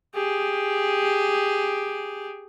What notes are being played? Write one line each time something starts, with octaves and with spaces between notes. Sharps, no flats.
G4 G#4